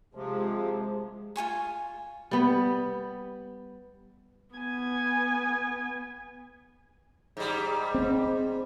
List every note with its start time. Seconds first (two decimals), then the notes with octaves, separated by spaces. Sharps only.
0.15 C3 F3 G#3
1.36 F4 A4 G#5 C#6
2.31 G3 B3
4.55 B3 G#5
7.37 G#2 G3
7.94 C4